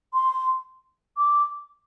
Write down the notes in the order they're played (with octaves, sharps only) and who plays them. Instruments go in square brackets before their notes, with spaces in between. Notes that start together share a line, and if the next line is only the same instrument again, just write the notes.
[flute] C6
D6